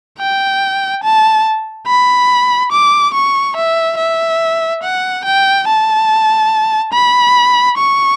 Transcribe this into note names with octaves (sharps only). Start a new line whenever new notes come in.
G5
A5
B5
D6
C#6
E5
E5
F#5
G5
A5
B5
C#6